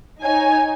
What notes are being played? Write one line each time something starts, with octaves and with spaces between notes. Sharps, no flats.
D#4 C#5 G#5